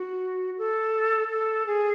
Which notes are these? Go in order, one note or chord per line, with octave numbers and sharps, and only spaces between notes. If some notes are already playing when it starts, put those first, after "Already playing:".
Already playing: F#4
A4
A4
G#4